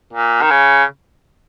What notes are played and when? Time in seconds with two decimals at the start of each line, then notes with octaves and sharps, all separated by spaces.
0.13 A#2
0.42 D#3
0.51 C#3